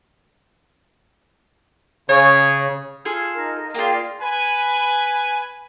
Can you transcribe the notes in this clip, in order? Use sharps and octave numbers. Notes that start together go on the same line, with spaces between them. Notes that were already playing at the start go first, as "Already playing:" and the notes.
C#3 C#5
F4 G#4 A4 F6
D#4 A#4
A#3 F4 G#4 D5 G5
B4 G#5